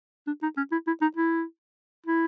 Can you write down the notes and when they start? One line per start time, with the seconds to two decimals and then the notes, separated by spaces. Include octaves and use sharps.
0.27 D4
0.42 D#4
0.57 C#4
0.72 E4
0.87 E4
1.02 D#4
1.17 E4
2.06 E4